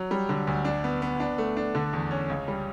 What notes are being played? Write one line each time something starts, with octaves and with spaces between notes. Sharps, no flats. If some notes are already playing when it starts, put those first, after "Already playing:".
Already playing: F#3
G3
D3
D2
D4
B3
B3
D4
A3
D4
D3
E2
C#4
C#2
G3